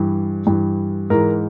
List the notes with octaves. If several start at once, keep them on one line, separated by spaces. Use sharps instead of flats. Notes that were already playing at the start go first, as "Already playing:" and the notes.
Already playing: G2 E3
G2 E3
G#2 E3 A#4